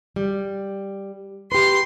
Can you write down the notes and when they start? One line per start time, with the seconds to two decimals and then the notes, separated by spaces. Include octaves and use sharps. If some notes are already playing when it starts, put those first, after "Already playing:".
0.16 G3
1.52 G4 B4 C6